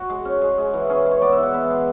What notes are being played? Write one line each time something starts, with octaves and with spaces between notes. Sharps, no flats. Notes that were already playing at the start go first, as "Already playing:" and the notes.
Already playing: F#4
G#3
C#4
G#3
G#3
E3
C#4 G#4
G#3
C#5
B3 D5
E5
E3 F#5
B3 E5
G#3